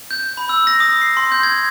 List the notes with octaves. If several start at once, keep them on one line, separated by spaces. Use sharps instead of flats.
G6
B5
E6
A#6
D#6
C7
C6
G6
G#6